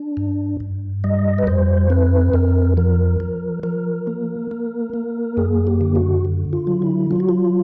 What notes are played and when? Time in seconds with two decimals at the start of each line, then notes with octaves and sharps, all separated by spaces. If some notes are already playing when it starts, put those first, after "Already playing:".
Already playing: D4
0.17 G2
0.60 G2
1.04 G3 D#5
1.38 B4
1.47 F2 C5
1.90 C4 B4
2.33 F2 A#4
2.77 F3 A#4
3.20 F3
3.63 F3 A#4
4.07 A#3
4.51 A#3
4.93 A#3
5.37 F#2 G#4
5.67 G4
5.81 D3
5.95 F#4
6.25 D3
6.53 F4
6.67 F#3
6.82 E4
7.11 F#3 F4
7.20 F#4
7.29 F4